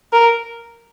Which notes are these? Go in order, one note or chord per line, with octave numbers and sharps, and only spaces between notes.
A#4